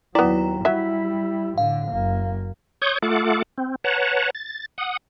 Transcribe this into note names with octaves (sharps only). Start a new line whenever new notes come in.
D#2 F#3 B3 E4 D5 G5 A#5
F#3 G3 E4 E5 B6
A2 D3 F5
F#1 A#3
C#5 C#6 D#6 G6
A3 F4 A4 F#5 D6
C4
B4 C#5 F#5 A5 A#5
A6
F#5 D#6